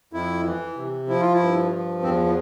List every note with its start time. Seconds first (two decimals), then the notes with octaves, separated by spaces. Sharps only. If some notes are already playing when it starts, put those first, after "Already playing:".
0.13 F2 E4
0.46 E3
0.76 C3
1.08 F3 E4
1.21 F4
1.34 E4
1.40 G2
1.72 F3
2.03 E2 C4
2.26 B3